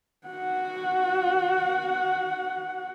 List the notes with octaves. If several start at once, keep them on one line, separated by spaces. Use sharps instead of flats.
F#4 F#5